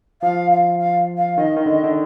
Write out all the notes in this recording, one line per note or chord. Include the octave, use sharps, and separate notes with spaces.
F3 F5
F5
F5
F5
D#3 D#5
D#3
D3
D3